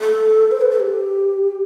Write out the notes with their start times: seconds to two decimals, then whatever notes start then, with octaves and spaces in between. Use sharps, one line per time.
0.01 A4
0.52 C5
0.61 B4
0.71 A4
0.80 G4